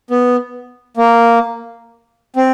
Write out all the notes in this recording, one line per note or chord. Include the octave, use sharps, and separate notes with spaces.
B3
A#3
C4